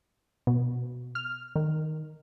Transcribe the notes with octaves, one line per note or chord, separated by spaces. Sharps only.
B2
F6
D#3